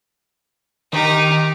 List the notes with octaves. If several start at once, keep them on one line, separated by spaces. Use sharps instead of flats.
D#3 D#4 G4